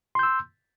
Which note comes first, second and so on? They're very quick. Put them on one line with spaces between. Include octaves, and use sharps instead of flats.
C6 G6 E6